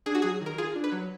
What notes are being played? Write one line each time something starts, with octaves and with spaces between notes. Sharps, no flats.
D4 G#4
F#4
F#3 G#4
D#3
A#4
F4 G#4
D4
B4
F#3